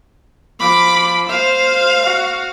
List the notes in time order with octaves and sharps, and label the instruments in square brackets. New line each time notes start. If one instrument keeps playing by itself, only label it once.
[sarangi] F3 [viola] B5 D6
[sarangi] C5 [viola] F5
[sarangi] F#4